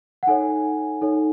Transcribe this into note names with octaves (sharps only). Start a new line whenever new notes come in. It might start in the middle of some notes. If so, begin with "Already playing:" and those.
F#5
D#4 A4 C#5 G#5
D#4 A4 C#5